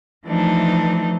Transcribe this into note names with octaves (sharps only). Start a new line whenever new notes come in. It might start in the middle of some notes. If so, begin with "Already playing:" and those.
E3 F3 A3 D4 D#4